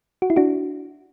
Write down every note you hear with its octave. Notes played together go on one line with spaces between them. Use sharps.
F#4
E4
D4 F#4